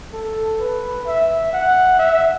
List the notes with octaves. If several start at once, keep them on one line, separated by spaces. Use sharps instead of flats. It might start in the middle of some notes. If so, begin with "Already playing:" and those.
A4
B4
E5
F#5
E5